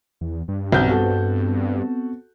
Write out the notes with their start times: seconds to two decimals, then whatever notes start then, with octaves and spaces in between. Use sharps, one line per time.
0.21 E2
0.48 G2
0.72 B1 B3 C4 G6
0.89 F#4 A4